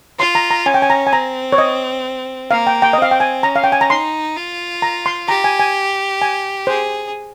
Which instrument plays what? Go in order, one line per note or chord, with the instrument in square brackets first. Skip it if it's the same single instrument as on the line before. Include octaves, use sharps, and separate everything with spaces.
[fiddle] F4 [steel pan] C6
[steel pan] A#5
A#5
[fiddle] C#4 [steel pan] G#5
[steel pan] G5
G#5
A#5
G#5
[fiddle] C4 [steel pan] A#5
[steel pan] C#5
D#5
[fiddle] A#3 [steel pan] F5
[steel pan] G5
G5
D#5
[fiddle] C4 [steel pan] F5
[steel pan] G5
G#5
[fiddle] C#4 [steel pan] A#5
[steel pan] F5
G5
G#5
A#5
[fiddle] D#4 [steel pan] C6
[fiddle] F4
[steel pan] A#5
C6
[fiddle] G4 [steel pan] A#5
[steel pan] G#5
G#5
G#5
[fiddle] G#4 [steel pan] C5